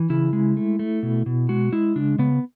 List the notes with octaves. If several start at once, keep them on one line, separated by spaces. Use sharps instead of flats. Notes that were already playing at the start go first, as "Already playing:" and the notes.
Already playing: E3
C#3 E4
G#3
A3
A3
B2
B2
G#3 F#4
G#3 E4
C#3 D4
C#3 B3